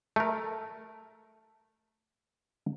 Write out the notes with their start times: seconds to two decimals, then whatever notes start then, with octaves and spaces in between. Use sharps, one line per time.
0.16 A3 A#4